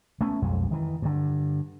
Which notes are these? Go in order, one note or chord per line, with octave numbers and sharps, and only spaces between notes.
A3 B3 C#4
B1 F2 G#3
D#3 E3
G2 D3